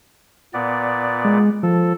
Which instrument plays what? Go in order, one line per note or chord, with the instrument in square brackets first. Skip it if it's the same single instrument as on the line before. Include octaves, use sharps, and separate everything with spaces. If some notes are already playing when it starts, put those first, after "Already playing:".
[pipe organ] A#2 B3 D5
[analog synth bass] G#3
[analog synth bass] F3 [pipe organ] A4